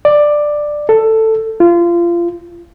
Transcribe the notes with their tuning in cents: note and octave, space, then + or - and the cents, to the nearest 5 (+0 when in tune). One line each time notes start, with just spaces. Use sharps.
D5 +10
A4 +10
F4 -25